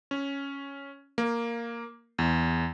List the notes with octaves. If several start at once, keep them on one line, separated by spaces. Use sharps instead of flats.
C#4
A#3
E2